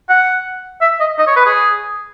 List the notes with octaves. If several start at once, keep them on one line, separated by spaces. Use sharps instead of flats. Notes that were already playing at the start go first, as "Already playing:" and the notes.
F#5
E5
D#5
D#5
C#5
B4
G#4